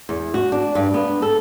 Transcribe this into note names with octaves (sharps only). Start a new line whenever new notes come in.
E2
F#4
D4
G2
B3
A4